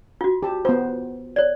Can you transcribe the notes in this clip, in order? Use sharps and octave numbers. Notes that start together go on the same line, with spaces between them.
F4 F#4
G4 A5
B3 F4 C5
C#5 D5